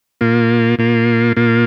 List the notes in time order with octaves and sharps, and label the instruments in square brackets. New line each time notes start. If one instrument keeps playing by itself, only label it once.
[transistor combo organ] A#2 A#3 F4
A#2 A#3 F4
A#2 A#3 F4